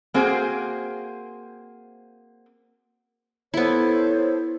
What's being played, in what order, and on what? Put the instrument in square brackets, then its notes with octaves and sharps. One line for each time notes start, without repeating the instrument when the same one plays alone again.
[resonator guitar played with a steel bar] A#3 C4 F#4 G#4 C5
[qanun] B3 E4 [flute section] A4 C5 C#5